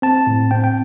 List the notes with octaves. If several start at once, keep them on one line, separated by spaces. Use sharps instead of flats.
C4 A5
A2
C4 G5
G5